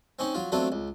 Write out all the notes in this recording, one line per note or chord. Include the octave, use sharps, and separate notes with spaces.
C4 C#4 D#4
F#3 F4
F#3 A3 B3 C4 D4 F4
C#2